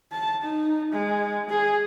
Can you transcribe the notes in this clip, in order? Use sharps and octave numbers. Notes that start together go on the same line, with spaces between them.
A5
D#4
G#3
G#4